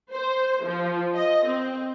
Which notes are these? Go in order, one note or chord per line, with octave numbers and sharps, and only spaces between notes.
C5
F3
D#5
C4